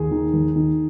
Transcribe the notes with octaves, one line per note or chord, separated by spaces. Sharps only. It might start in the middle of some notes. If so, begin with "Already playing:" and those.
Already playing: D#2 G#4
D#3
D#2
D#3